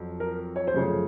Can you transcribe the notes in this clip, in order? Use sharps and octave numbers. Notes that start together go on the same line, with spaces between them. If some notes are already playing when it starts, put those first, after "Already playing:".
Already playing: F2 F#3
A#4
C#5
C5
F#2 C#3 F3 A3 C#5